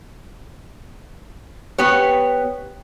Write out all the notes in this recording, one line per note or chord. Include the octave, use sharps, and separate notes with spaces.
B3 G4 C#5